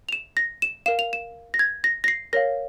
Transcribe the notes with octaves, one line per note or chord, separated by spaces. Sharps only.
F7
E7
A#6
E7
A#4 F5 E7
F7
E7
A#6
G#6
A#6
A#6
C7
A#4 C#5 F5 A#6